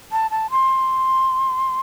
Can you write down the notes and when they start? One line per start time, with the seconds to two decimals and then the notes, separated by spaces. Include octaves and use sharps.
0.12 A5
0.31 A5
0.51 C6